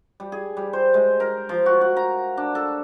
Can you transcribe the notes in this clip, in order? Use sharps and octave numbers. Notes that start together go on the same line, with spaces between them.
G3
G#4
G3
C5
G#3
A#4
F3
F#4
F#4
A#5
D4
A4